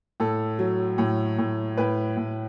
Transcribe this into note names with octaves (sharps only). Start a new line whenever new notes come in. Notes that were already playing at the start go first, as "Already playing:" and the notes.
A2 A4
F#3
A2
A2
A2 B4
A2